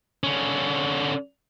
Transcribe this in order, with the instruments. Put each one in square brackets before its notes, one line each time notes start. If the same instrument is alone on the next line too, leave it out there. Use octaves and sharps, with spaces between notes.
[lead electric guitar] D3 C#4